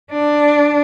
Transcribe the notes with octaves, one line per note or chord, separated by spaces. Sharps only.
D4